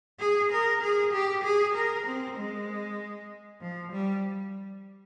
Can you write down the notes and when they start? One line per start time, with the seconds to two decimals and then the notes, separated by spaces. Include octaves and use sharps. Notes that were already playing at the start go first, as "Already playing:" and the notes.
0.20 G#4
0.52 A#4
0.82 G#4
1.13 G4
1.44 G#4
1.75 A#4
2.07 C4
2.37 G#3
3.61 F3
3.92 G3